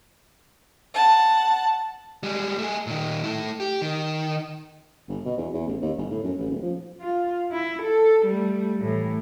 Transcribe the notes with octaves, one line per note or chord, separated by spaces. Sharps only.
F#5 A5
G3 G#3
A3 G#4
A#2 D#3
A3 E4
G4
D#3
G1
B2
E2
E2
A1
D#2
G1
A2
F#2
A1
D#1
F3
F4
E4
A4
G3 A3
A2 E3